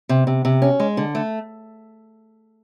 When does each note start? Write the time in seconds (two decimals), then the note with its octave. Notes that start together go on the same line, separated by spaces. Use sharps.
0.09 C3
0.27 C3
0.45 C3
0.62 C#4
0.80 G#3
0.97 D3
1.15 A3